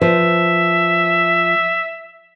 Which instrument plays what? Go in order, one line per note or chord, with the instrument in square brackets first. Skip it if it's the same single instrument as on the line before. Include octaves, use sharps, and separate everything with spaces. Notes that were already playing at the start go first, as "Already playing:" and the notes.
[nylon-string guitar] F3 B4 C5 [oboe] E5